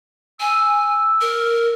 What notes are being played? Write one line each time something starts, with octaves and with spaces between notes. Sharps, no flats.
G#5 E6
A#4